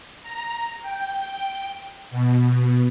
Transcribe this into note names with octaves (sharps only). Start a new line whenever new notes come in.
A#5
G5
B2